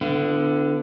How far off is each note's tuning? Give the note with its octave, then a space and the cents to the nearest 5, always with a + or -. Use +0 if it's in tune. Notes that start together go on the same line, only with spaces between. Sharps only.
D3 +0 B3 +35 F4 -45